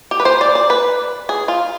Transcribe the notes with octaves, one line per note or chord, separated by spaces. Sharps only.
G4
B4
C5
D5
D5
B4
G#4
F4